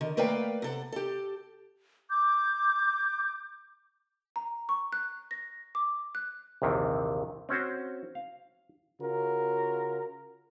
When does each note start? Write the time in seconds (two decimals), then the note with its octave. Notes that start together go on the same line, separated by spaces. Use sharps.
0.01 D3 D#3
0.17 A3 A#3 B4 D5 F5 G5
0.62 C3 A4 F#5
0.92 G4 A4
2.09 D6 G6
4.36 A#5
4.69 C#6
4.93 F#6
5.31 A#6
5.75 D6
6.15 F#6
6.62 A#1 D#2 C3 D#3 E3
7.49 C4 C#4 F#4 C5
8.15 F5
9.01 C#3 F4 F#4 A#4